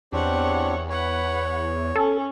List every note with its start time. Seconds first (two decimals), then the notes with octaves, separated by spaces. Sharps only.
0.13 E2 C4 D4 G4 C#5 F#5
0.90 B4 C#5 F#5
1.96 C#4 A4